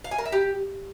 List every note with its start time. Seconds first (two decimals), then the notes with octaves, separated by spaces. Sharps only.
0.04 F5
0.11 G#5
0.18 A#4
0.25 E5
0.32 G4